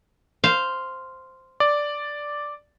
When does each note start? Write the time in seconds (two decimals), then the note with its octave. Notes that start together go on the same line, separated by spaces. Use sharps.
0.44 C5 F5
1.60 D5